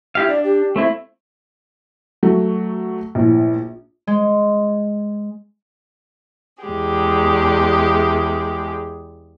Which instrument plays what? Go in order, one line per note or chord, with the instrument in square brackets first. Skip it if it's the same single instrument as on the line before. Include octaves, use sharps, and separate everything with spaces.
[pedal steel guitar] E4 G4 F5
[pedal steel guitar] D4 [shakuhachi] D5
[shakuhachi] G4
[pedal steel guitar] A3 C4 E4
[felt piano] F#3 A3 F#4
A#1 A2
[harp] G#3
[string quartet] E2 G#3 G4 G#4